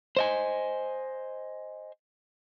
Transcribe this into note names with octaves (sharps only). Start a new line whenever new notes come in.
C5 D#5 G#5